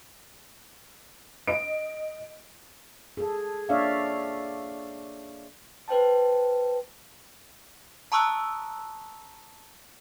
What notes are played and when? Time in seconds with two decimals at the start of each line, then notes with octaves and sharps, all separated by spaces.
1.47 D#5 D7
3.17 G#4 A4
3.69 A#3 D4 C#5 D5 E5 F5
5.88 B4 C5 G5 A5
8.12 A5 A#5 C#6 D#6 E6 F#6